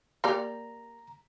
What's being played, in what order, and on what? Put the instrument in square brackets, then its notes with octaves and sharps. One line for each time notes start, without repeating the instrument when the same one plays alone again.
[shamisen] A#3 G4 D5 [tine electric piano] A#5